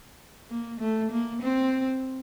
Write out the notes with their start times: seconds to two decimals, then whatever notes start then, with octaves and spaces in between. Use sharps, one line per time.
0.50 A#3
0.80 A3
1.11 A#3
1.42 C4